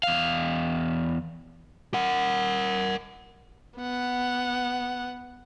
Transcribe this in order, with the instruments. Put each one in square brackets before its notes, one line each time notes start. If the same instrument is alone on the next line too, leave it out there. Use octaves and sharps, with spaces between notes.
[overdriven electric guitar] E2 F5
[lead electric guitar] A#4 F#5
[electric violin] B3 F#5